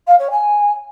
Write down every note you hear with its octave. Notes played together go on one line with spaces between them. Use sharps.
F5
C#5
G#5